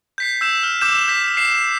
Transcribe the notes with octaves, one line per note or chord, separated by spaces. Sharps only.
G6 B6 C7
E6 G6 E7
F6
D6 E6 G6 E7
G6 B6
C7 E7